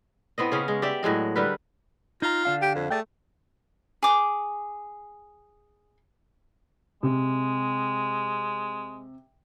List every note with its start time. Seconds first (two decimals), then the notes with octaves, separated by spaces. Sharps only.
0.38 A2 B3 C4 D#5
0.52 C#3 C#4 G#4
0.68 G#3
0.82 G4 D5 E5
1.03 A2 F#3 G#3 D#5
1.36 D3 G3 A#4 B4
2.22 D#4 F4 A#5
2.45 D3 D4 F5
2.62 G4
2.75 F2
2.90 A3 G#4 D5 G5
4.03 G#4 D6
7.03 C3 G#3